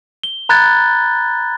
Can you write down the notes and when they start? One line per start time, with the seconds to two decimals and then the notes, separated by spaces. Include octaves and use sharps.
0.23 G7
0.49 A#5 B5 F#6 G#6 A6